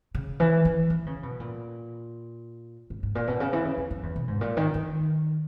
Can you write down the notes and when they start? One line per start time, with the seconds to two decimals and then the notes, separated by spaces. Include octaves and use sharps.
0.15 C#3
0.40 E3
0.65 E3
0.90 E3
1.06 C#3
1.23 B2
1.40 A#2
2.90 G#2
3.03 G#2
3.15 A#2
3.27 B2
3.40 C#3
3.53 E3
3.65 C#3
3.78 E2
3.91 F#2
4.03 E2
4.16 B2
4.28 G#2
4.41 A#2
4.57 D#3
4.74 D#3